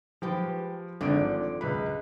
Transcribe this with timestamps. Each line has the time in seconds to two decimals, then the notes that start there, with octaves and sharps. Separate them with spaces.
0.22 F3 G#3 G4 B4
1.01 G#1 G2 D3 F3 D7
1.61 C#2 B4 B5